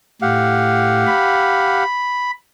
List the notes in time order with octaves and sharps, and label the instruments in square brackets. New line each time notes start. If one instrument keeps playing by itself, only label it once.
[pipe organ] A2 [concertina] G4 F5 F#5
[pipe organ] B5